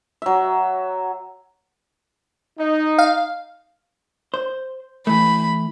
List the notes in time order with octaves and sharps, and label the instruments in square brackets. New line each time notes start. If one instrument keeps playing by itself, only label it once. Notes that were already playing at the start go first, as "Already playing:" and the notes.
[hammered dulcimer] F#3 E5
[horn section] D#4
[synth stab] F5
[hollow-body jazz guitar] C5
[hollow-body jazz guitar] E3 A3 [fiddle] B5